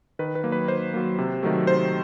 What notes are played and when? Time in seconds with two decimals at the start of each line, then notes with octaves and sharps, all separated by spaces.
0.19 D#3 B4
0.35 B4
0.44 F#3 A#3
0.52 B4
0.68 D#3 C5
0.94 F#3 A#3
1.18 C3
1.43 D#3 F#3 A3
1.67 C3 C5